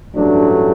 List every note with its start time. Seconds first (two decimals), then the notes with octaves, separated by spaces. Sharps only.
0.14 A1 G2 F#3 A3 D4